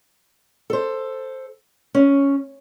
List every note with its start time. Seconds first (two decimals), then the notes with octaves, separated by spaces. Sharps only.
0.70 A4 C5
1.95 C#4